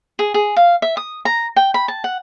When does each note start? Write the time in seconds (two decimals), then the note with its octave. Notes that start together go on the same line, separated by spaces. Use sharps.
0.19 G#4
0.34 G#4
0.56 F5
0.82 E5
0.97 D#6
1.25 A#5
1.56 G5
1.74 B5
1.88 A5
2.04 F#5